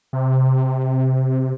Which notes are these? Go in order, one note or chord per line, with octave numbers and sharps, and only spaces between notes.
C3